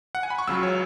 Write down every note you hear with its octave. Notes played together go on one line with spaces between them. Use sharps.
F#5
G#5
B5
C#6
C#2 C#3 F#3 E6
C#5